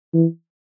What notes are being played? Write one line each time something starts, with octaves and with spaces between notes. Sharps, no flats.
E3